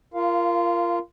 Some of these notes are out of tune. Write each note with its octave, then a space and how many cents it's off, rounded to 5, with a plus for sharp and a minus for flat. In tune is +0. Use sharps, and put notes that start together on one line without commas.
F4 -20 A#4 +0 F5 +0